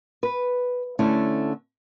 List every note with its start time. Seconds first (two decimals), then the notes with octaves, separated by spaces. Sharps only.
0.23 B4
0.99 D3 A3 C#4 E4 A4